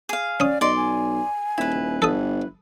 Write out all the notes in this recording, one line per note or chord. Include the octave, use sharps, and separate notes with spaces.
G#4 F5
C#4 D5 D#6
B1 D5 D#5 C6
G#5
D#1 E4 B4
G1 A4 D#6